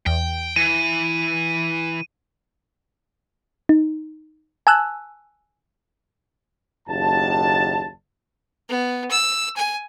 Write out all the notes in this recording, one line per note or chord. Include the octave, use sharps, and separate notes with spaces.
E2 G5
E3 D#7
D#4
G#5 A5 E6 F#6
F#1 D#2 A5
B3
E6
G#5